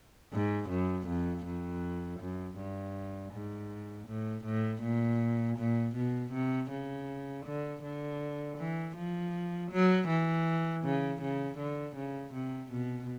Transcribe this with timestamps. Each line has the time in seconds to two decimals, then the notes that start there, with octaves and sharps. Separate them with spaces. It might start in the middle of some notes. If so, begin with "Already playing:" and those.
0.33 G#2
0.70 F#2
1.07 F2
1.45 F2
2.20 F#2
2.58 G2
3.33 G#2
4.08 A2
4.45 A2
4.83 A#2
5.58 A#2
5.96 B2
6.33 C3
6.71 C#3
7.46 D3
7.83 D3
8.58 E3
8.96 F3
9.72 F#3
10.08 E3
10.85 C#3
11.22 C#3
11.59 D3
11.96 C#3
12.34 C3
12.72 B2